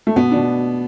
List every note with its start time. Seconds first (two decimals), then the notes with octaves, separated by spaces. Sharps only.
0.07 A3
0.16 B2 B3
0.31 B2 D4